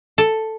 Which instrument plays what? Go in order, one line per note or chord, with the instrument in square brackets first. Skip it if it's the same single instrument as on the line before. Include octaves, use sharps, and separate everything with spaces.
[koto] A4